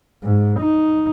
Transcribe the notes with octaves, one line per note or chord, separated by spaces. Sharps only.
G#2
D#4